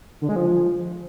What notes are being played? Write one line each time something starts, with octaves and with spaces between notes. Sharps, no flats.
D3
G#3
F3